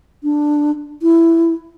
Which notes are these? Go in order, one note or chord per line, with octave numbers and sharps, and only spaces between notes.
D4
E4